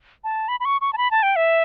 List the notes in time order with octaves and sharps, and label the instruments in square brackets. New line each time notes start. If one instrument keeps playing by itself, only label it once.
[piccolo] A5
B5
B5
C#6
C#6
A5
B5
A5
G5
E5